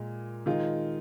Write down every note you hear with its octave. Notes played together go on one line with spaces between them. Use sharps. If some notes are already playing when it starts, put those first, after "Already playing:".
Already playing: A#2 G#3
D#3 G#3 F4